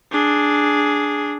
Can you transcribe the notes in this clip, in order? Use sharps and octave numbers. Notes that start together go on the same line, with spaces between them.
D4 G#4